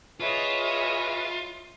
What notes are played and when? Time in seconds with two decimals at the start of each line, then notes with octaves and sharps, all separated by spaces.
0.20 F4 G#4 B4 C#5 D#5 E5